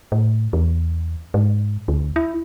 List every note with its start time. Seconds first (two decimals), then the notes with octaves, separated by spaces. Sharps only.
0.12 A2
0.53 E2
1.34 G#2
1.88 D2
2.16 E4